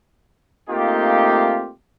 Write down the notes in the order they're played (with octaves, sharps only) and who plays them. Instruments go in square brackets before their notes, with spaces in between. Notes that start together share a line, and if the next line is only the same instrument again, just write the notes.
[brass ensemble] A3 A#3 C4 D#4 F4 G4